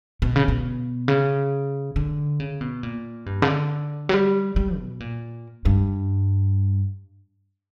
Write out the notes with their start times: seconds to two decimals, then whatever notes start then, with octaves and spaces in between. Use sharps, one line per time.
0.22 B2
0.36 C#3
0.48 B2
1.08 C#3
1.96 D3
2.40 C#3
2.61 B2
2.83 A#2
3.26 G2
3.42 C#3
3.47 D3
4.09 F#3
4.14 G3
4.56 G3
4.78 B2
5.00 A#2
5.65 G2